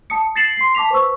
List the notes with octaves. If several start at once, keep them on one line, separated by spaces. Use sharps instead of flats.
A5 D#6 C#7
A6 A#6 C7 C#7 E7 F#7
C6 C7
A5 D6 B6 F7
B4 C5 C#6 E6